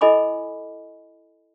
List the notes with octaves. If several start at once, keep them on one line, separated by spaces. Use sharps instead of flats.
E4 A4 D#5 G#5 B5 D6